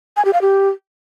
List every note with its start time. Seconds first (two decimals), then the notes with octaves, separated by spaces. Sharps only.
0.17 G#5
0.25 G4
0.33 F5
0.41 G4